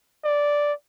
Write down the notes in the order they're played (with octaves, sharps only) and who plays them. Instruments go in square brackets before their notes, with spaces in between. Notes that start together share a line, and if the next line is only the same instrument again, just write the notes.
[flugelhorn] D5